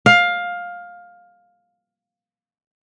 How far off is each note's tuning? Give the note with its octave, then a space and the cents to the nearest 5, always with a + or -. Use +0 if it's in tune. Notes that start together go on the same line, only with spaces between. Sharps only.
F5 +15